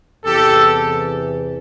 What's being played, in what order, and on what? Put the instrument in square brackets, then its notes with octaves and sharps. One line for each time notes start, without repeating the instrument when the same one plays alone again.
[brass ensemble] E2 C3 E3 G4 A4